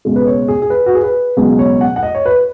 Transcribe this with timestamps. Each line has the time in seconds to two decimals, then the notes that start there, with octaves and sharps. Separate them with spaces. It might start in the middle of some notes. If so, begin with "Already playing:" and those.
0.05 C#2 B2 G#3
0.16 B4
0.27 C#5
0.48 G#4
0.62 G#4
0.70 B4
0.86 F#4
0.95 G#4
1.04 B4
1.37 C#2 B2 F#3 G#4
1.59 C#5
1.81 F#5
1.96 F#5
2.03 D#5
2.15 C#5
2.26 B4